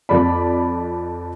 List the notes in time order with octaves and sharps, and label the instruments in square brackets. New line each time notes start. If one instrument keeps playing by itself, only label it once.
[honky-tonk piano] F2 D5 B5